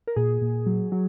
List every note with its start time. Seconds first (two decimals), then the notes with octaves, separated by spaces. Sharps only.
0.07 A#4
0.16 A#2 G#4
0.41 A#2
0.66 F#3
0.92 F#3